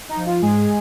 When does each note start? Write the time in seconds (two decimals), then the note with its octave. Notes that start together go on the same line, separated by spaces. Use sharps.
0.09 D#4
0.17 F3
0.26 F4
0.42 G#2 G#3 G#4